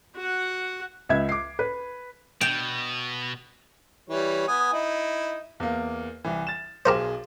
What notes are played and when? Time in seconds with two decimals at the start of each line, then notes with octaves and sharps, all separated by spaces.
0.16 F#4 F#5
1.09 C#2 E5 G#6
1.29 D6 C7
1.59 B4
2.41 B2 G5
4.10 E3 G3 C#5
4.48 B3 G#5 D#6
4.73 D#4 E4
5.60 E2 A#3
6.24 C2 E3
6.47 A6 E7
6.85 B1 G4 G#4 A#4 C5 E7